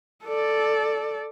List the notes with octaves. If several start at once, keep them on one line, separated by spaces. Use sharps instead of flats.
A4 D5